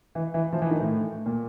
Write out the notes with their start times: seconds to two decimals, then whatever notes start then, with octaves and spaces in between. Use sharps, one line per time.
0.15 E3
0.34 E3
0.52 F3
0.62 E3
0.71 D#3
0.80 A2
1.26 A#2